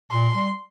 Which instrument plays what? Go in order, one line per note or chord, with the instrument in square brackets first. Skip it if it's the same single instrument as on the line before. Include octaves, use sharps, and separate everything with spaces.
[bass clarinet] A#2 [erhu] C6
[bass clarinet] G3